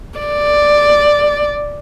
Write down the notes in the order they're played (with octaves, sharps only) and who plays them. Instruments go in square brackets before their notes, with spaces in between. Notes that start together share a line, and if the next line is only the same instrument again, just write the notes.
[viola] D5